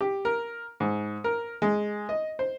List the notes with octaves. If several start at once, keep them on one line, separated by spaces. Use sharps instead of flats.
G4
A#4
G#2
A#4
G#3
D#5
C5